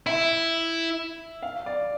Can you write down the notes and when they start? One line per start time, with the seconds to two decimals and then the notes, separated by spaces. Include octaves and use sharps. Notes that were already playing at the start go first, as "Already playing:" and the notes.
0.06 E4 E5
1.42 F5
1.66 D5